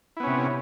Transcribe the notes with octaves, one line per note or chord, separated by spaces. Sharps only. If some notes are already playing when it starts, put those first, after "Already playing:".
C3 B3 C#4 E4